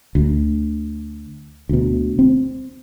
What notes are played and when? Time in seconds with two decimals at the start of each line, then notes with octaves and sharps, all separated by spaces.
0.15 D2
1.69 D2 B2
2.19 C4